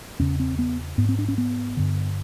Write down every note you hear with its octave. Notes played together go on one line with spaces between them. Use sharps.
E2 C#3 C#4
C4
B3
G#2 B3
C4
D4
C#4
B3
G2 D3